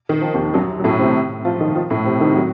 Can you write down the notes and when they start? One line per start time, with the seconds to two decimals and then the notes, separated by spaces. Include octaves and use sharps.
0.09 D#3
0.21 F3
0.34 D#2 D#3
0.54 F#2 F#3
0.80 F#3
0.84 A2 A3
1.00 C3 C4
1.45 F3 F4
1.60 D#3 D#4
1.75 F3 F4
1.90 A2 A3
2.05 C3 C4
2.20 D#3 D#4
2.36 F#3 F#4